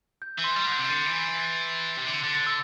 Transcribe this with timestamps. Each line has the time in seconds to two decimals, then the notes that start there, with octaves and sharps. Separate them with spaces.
0.22 G6
0.38 E3
0.44 C6
0.55 G3 A6
0.66 D3
0.72 G6
0.77 C3
0.85 C7
0.89 D3 A6
1.06 E3 D7
1.23 C7
1.40 A6
1.97 C3
2.07 D3
2.24 D3 A6
2.35 A6
2.47 E6